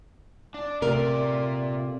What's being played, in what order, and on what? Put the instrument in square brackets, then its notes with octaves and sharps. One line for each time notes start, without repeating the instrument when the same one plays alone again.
[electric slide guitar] D4
[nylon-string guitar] C3 A3 A#4 [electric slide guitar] F4 D5